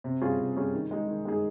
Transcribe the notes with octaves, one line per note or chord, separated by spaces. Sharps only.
C3
G3 C#4 F4 G#4
C3
G3 C#4 F4 G#4
D#3
G#3 D#4 G#4
D#3
G#3 D#4 G#4